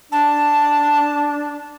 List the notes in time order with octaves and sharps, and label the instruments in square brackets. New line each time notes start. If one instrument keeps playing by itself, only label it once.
[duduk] D4 [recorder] A5